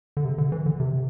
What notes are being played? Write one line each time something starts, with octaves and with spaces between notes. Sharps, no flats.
D3
C3
D3
E3
D3
C3